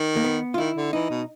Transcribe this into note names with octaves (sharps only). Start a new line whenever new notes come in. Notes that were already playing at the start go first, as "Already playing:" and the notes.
Already playing: D#3
A#3
B3
F4
D#3 E4
D3
E3 D#4
B2